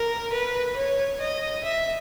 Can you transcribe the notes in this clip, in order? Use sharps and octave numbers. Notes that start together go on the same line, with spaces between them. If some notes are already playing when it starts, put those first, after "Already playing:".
Already playing: A#4
B4
C#5
D#5
E5